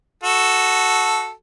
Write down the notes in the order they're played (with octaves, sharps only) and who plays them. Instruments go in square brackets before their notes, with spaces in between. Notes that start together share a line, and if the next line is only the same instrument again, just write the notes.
[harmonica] F#4 A4